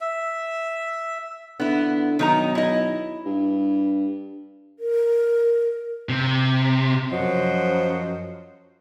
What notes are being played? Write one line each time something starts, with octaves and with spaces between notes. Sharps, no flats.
E5
D3 B3 E4
B1 D#3 D#4 A#5
E4 D#5
G2
A#4
C3
F#2 F3 F#3 C5 D#5